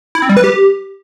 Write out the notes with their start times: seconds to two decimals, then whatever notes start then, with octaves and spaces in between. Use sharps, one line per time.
0.15 E4
0.22 C4
0.29 G3
0.37 B4
0.44 G4